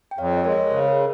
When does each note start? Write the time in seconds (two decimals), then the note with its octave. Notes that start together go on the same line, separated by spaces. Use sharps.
0.11 G5
0.18 F2 C#5 F5
0.33 D#5
0.44 G#3 A#4 C#5
0.61 C#5
0.70 C#3 C5
0.88 A#4